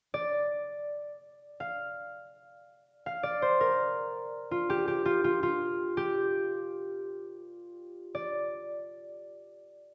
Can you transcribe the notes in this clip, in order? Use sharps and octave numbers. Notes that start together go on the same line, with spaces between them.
D5
F5
F5
D5
C5
A#4
F4
G4
G4
F4
F4
F4
G4
D5